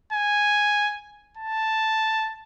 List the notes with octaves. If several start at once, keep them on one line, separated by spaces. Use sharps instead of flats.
G#5
A5